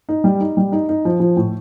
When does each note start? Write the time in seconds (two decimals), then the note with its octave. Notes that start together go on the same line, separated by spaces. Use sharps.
0.09 D#4
0.24 G3
0.40 D#4
0.57 G3
0.72 D#4
0.89 D#4
1.05 F3
1.20 F3
1.37 A2